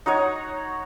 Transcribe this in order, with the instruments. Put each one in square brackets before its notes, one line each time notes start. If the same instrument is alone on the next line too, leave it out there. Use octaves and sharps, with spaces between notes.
[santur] D#4 F#4 C#5 D#6